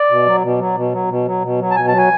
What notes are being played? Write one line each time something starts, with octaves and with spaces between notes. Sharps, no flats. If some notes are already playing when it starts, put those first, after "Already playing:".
Already playing: D5
B2
F#3
B2
F#3
B2
F#3
B2
F#3
B2
F#3
A5
B2 G#5
F#3 A5
G#5